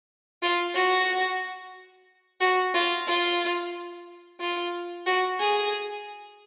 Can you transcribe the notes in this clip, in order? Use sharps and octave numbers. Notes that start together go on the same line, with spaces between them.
F4
F#4
F#4
F4
F4
F4
F#4
G#4